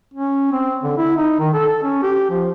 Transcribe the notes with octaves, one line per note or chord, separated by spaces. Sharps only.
C#4
C4
D3
E4
D#4
D#3
A4
C#4
G4
F3